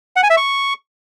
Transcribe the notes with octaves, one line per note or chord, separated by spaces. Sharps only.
F#5
G#5
E5
C#6